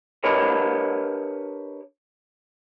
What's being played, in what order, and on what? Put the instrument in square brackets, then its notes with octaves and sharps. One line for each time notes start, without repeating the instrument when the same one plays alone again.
[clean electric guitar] D4 G4 A#4 B4 C#5 D#5